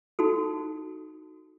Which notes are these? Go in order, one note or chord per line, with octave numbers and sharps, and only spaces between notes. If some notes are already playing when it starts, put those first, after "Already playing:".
D#4 F#4 A4